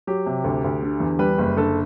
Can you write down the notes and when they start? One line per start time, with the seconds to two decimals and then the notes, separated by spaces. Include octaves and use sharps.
0.07 F#3 G4
0.26 C3
0.44 D2
0.64 D2
0.83 D3
1.00 E2
1.19 G3 B4
1.38 F#1
1.57 D3 A4